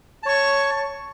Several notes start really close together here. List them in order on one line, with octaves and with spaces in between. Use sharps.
A5 C#5 C#6